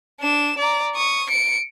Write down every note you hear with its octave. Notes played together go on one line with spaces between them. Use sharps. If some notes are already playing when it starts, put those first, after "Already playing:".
D4 E7
D5 A#5
C#6 D#6
C#7 D7